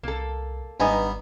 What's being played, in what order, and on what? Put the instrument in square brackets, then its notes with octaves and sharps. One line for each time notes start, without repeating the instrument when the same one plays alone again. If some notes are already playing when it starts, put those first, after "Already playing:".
[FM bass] C2 [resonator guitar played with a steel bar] A#3 A4
[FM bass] G#1 [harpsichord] G2 B3 [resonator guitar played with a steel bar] D#4 D#5 G#5